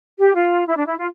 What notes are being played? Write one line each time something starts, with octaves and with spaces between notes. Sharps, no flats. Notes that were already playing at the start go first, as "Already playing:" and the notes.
G4
F4
E4
D4
E4
F4